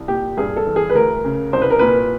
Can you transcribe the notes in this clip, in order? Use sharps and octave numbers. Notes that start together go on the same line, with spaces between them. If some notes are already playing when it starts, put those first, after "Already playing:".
Already playing: C2
A#2 G4
G2 G#4
A4
E3
G#4
B4
D2 A#4
C#3
C2 C5
B4
A#4
A#2 B4